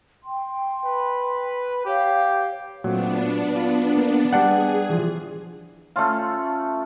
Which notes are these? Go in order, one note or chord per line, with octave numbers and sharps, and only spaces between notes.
G5 C6
B4
G4 C#5 F5
A#2 F#3 A3 B3 C4 D4
F4
A#3
G3 B3 D4 G#4 F#5
E3 F3
A3 C#4 F4